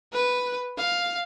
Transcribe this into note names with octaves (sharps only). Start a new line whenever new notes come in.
B4
F5